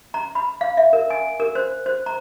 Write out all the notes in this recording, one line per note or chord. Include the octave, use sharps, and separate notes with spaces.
A#5
B5
F5
E5
A#4
G#5
A#4
C5
C5
A#5